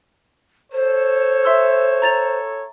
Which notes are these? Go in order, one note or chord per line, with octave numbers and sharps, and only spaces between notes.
A4 C5 C#5
E5 C6 E6
A#5 A6 F7